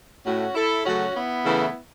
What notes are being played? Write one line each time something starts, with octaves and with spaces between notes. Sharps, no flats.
A2 A3 C#4 F#4
E4 A4
C#3 F#3 A3 C#4 F#4
B3 E4
C#3 E3 A3